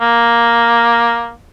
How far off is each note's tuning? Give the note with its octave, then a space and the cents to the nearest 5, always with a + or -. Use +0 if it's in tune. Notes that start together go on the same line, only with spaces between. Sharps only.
A#3 +5